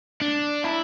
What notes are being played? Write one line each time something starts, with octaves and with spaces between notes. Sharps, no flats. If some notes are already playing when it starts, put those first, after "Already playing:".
D4
E4